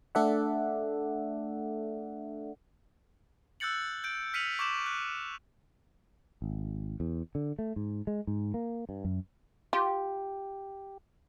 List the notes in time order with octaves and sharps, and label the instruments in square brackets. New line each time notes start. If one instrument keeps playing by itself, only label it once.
[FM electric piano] A3 D4 A4 D5 E5 F#5
[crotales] E6 F#6 G6 A6 C#7 F#7
G6 D7
F6 B6 C#7 D#7 F7 F#7
C#6 D6 G6 E7 F#7
F#6
[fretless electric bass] G#1
E2
D3
A3
G#2
G#3
G#2
A#3
G2
F#2
[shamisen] F4 [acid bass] G4